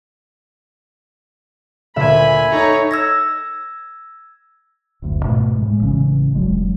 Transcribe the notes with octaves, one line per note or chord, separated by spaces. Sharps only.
D2 A#2 E5 G#5 B5
D#4 A4 C#5 A#5
E6 G#6 A#6
F#1 D2
G#2 B2 A3
A2 G#3
A1 C#3 E3 C#4
E1 G2 F#3 G#3